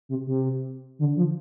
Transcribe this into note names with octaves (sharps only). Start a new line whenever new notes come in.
C3
C3
D3
F3